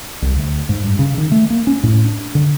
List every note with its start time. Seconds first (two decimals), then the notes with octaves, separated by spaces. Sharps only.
0.22 C2
0.36 D2
0.69 G#2
0.83 G2
0.99 C#3
1.18 D#3
1.32 A3
1.50 A#3
1.67 C#4
1.83 A2
2.05 D4
2.35 D3